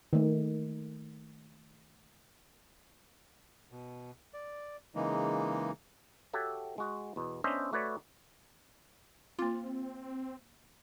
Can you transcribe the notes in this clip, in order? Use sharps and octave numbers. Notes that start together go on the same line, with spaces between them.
D#3 A3
B2
D5
C#3 E3 G#3 A#3 D#4
F#4 G4 A4 C#5 E5
G#3 F#4
E2 B2
B3 C#4 D4 C5 D#5 E5
A3 F#4 B4 C#5 D5
A#3 C4 F4 D6